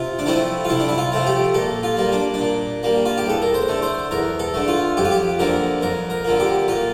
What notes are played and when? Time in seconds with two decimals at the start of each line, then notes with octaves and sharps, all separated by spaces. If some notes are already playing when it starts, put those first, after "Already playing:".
Already playing: C3 F4
0.19 D4
0.26 F3 A3 C4 E4
0.65 F4
0.69 C3 E4
0.80 D4
0.88 E4
0.98 F4
1.12 F3 A3 C4
1.26 G4
1.54 A#2 A4
1.83 F4
1.97 G3 A#3
2.12 D4
2.34 D4
2.40 A#2
2.83 G3 A#3
3.06 F4
3.18 G4
3.26 E2 A4
3.42 A#4
3.54 C5
3.68 D3 A3
3.82 C5
4.11 E2 A#4
4.39 A4
4.54 D3 A3
4.68 F4
4.97 F2 G4
5.05 F4
5.11 G4
5.39 D3 F3 A#3 A#4
5.81 F2 A#4
6.10 A#4
6.25 D3 F3 A#3
6.40 G4
6.68 A#2 F4